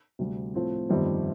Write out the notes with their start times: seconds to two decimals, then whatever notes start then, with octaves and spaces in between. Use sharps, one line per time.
0.19 D2 C3 G3
0.54 A2 F3 A3 C4 F4
0.89 G1 F2 D#3 G3 C4